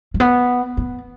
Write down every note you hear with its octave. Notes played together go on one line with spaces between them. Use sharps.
G#3
B3
B3